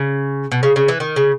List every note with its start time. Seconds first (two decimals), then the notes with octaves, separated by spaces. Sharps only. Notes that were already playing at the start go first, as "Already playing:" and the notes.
Already playing: C#3
0.52 B2
0.63 C#3
0.76 C#3
0.88 E3
1.00 D#3
1.16 C#3